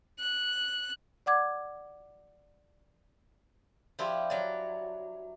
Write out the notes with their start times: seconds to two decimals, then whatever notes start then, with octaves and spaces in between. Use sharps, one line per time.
0.20 F#6
1.26 D5 F#5 D6 G#6
3.99 F3 D4 E4 F4 G4
4.30 F#3 D5